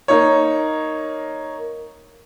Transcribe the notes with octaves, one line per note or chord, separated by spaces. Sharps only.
A#3 D#4 C#5